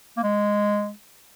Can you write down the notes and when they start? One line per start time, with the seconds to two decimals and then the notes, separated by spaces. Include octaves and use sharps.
0.17 A#3
0.23 G#3